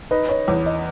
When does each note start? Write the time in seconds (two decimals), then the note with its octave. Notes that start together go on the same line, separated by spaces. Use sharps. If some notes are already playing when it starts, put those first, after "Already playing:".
0.11 D#4 B4
0.29 C#5
0.47 E2 C#5
0.66 D#5